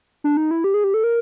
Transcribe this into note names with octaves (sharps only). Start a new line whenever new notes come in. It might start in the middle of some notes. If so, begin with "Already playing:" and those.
D4
D#4
E4
G4
G#4
G4
A4
A#4